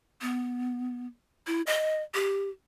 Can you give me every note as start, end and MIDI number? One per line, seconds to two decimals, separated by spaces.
0.21 1.06 59
1.47 1.62 64
1.66 2.02 75
2.14 2.49 67